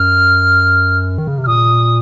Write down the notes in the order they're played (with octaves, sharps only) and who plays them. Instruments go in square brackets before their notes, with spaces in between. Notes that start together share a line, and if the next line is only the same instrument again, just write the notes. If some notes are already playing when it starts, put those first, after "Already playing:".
Already playing: [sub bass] F#2 [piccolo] F6
[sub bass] D#3
C#3
C3
[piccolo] F6
[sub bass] A#2 [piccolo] D#6